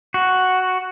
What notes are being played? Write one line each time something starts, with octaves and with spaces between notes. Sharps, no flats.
F#4